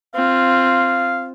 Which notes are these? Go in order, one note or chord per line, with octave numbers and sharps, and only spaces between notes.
C4 F4 F5